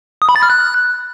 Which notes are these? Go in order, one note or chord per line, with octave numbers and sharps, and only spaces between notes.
D#6
B5
A6
F6
F#6